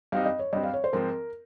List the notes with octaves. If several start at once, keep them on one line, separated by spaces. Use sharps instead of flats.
G2 G3 C4 D#4 F5
D#5
C#5
G2 G3 C4 D#5
F5
C#5
C5
G#2 F3 C4 A#4